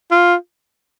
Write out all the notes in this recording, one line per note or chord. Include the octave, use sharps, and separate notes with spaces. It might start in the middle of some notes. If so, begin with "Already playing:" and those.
F4